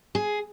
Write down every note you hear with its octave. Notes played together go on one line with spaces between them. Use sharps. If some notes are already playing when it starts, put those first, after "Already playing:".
G#4